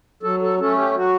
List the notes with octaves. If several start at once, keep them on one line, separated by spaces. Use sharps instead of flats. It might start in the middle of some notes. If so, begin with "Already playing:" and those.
F#3 A4
A4
A3 C#4 A4
G4
F#3 F#4